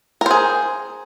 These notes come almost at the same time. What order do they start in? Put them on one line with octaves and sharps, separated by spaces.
A#4 C5 G#4